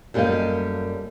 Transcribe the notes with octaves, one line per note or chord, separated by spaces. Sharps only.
F#2 G3 A3 A#3 D#5 F5